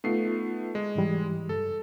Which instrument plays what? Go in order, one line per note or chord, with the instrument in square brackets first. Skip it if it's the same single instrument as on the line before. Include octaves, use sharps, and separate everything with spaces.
[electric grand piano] A3 B3 C7 [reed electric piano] D#4 F4
[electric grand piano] G#3
[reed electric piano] G#2 E3 G3
[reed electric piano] G2 [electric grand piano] A4